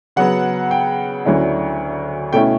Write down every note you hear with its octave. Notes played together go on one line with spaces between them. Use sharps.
C#3 F#3 B3 F#5
G5
D2 D3 F#3 C#4 E4
B2 A3 C#4 E4 G5